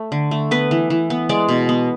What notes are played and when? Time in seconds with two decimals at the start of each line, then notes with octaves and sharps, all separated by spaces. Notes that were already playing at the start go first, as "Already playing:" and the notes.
Already playing: A3
0.12 D3
0.31 A3
0.51 B3 B4
0.71 E3
0.90 E3
1.10 B3
1.29 G#3 D5
1.49 B2
1.69 B3